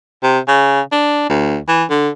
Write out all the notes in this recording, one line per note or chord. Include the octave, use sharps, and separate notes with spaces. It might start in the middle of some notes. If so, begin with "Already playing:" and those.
C3
C#3
D4
D2
E3
D3